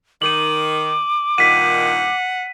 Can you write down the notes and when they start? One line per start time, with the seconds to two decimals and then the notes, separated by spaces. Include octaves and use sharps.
0.22 D#3 D6 D#7 F#7
1.38 G2 A#2 D#3 F#5 B6 D#7